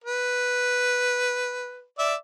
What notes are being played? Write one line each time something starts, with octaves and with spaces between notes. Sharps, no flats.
B4
D5 E5